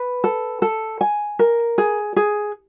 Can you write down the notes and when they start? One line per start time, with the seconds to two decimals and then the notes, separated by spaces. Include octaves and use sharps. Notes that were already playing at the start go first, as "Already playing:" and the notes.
Already playing: B4
0.24 A4
0.62 A4
1.01 G#5
1.39 A#4
1.78 G#4
2.16 G#4